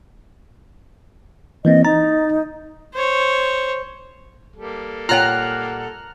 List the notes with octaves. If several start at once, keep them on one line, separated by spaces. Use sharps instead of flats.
E3 A#3 C4 D#5
D#4 A#5 A6
C5 C#5
G3 A#3 A4
A#2 F4 C#5 F#5 G5 A#5 F6 F#6